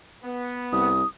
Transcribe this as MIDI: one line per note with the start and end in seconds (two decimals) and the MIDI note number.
0.23 0.90 59
0.72 1.03 36
0.72 1.07 87